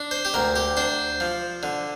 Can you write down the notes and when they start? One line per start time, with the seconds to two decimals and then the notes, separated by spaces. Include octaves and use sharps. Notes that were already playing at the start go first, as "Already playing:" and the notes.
Already playing: D4
0.11 C5
0.25 G4
0.34 D2 A#4
0.56 G4
0.77 D4 C5
1.20 F3
1.63 D3